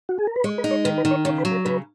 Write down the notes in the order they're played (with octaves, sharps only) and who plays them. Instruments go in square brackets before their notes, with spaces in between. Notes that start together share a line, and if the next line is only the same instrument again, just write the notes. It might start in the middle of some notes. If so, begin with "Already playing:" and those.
[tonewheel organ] F#4
G#4
A#4
B4
[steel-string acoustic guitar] G#3 [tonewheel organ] C#5
[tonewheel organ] B4
[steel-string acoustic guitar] D#4
[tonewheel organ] C#5
[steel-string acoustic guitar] D#3 [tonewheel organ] B4
[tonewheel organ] B4
[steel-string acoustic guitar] D#3
[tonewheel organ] C#5
[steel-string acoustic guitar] C#3 [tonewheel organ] C#5
[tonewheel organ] B4
[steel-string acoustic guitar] F#3
[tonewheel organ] A#4
[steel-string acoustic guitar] C#3 [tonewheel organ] B4